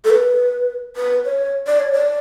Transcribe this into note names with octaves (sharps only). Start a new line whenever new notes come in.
A4
B4
B4
C#5
D5
C#5
D5